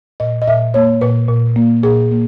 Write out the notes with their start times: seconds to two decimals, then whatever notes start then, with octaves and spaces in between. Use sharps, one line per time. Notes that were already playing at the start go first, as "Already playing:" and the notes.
0.20 A#2 D#5
0.42 D#5
0.47 A#2 E5
0.74 A#3 C#5
1.01 A#2 B4
1.29 A#2
1.56 A#3
1.83 A#2 G#4
2.11 A#3